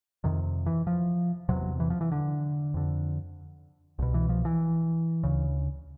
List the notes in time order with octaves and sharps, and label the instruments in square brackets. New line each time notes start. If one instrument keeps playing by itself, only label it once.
[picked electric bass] F2 C3 D#3
E3
F3
E2 C3 F#3
E3
F3
E3
D3
F2 D3
C2 B2
E3
F3
E3
D2 C#3